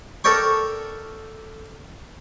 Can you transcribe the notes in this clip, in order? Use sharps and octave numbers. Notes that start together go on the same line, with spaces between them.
A4 A#4 D5 G5 C#6